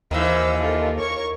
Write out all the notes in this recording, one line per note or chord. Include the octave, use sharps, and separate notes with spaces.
D#2 D#3 E3 C5 F5 E6
F4 A4 A#4
A#4 C#5 C#6